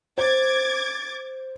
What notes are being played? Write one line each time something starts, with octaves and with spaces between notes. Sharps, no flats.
C5 D6 G#6 A6